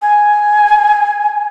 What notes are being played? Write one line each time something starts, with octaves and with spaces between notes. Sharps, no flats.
G#5